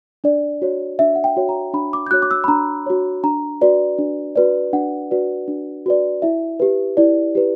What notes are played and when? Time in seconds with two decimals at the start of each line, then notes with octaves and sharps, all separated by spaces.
0.24 D4 D5
0.62 F#4 C#5
0.99 D4 E5
1.16 F#5
1.24 G5
1.36 F#4 C#5
1.49 A#5
1.73 D4 B5
1.93 D6
2.07 G6
2.11 F#4 C#5 F#6
2.22 D6
2.31 E6
2.44 B5
2.48 D4 A#5
2.86 F#4 C#5
3.23 D4 A#5
3.61 F#4 B4 D5
3.98 D4
4.36 F#4 B4 D5
4.73 D4 F#5
5.11 F#4 B4 D5
5.48 D4
5.86 F#4 B4 D5
6.22 E4 E5
6.60 G4 B4
6.97 E4 D5
7.35 G4 B4